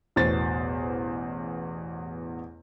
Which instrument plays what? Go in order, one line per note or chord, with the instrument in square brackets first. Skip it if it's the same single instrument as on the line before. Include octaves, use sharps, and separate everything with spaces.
[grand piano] A1 E2 B2 C5 A6